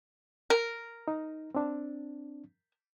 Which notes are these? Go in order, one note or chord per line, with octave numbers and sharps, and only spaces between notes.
A#4
D#4
C4 D4